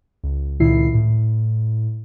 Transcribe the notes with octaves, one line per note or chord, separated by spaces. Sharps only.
C#2
C#2 A#2 D#3 E4 C7
A2